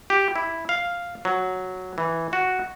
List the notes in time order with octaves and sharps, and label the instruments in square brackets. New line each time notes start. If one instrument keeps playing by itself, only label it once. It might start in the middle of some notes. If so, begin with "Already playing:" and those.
[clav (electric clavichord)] G4
E4
F5
F#3
E3
F#4